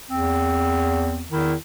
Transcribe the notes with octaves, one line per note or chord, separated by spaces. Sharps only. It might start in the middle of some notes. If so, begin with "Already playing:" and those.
E2 C4
E2 D#3 E4